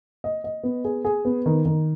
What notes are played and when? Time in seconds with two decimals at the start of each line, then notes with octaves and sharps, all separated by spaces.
0.24 D#5
0.44 D#5
0.63 B3
0.84 G#4
1.05 G#4
1.25 B3
1.46 D#3
1.65 D#3